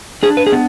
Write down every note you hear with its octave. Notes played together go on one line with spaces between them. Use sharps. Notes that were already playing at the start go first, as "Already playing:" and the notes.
D4 G#4
B4
G#4
B3